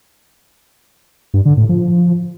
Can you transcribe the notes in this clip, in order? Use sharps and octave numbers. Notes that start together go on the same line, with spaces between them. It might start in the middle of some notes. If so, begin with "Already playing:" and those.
G2
D3
A2
F3